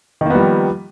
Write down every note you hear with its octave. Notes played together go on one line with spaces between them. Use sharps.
D#3 F3 G3 A#3 B3